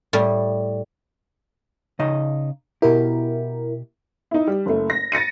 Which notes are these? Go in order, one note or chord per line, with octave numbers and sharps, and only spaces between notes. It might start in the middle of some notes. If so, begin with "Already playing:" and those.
A2 G3
C#3 D#4 D#5
B2 E4 G4 A#4
D#4 E4
G3
F#1 A3
A#6
A6 A#6 C#7 D#7